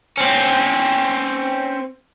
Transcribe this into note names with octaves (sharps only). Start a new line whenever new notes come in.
C4 C#4